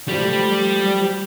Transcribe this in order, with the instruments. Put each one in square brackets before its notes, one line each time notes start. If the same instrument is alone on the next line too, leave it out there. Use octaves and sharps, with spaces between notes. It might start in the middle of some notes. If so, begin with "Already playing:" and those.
[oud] F3 A3 [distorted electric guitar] G3